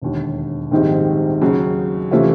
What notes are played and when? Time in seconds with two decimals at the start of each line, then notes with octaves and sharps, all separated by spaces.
0.02 E1 D#2 D3
0.71 A#1 G#2 D#3 G3 C4
1.41 D#2 C#3 F#3
2.11 C3 E3 A3 C#4 F4